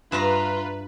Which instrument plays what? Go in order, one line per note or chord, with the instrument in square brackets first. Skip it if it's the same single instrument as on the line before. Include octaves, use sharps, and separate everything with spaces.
[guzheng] G2 [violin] F4 [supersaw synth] B4 [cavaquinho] E5 F5 A#5